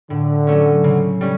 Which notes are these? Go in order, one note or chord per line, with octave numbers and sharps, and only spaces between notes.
A2 D3
F#3 A3 C#4
C#3
G3 C#4